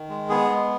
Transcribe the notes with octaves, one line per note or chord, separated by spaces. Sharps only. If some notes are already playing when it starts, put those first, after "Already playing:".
Already playing: D#3
G#3
B3 G#4
G#3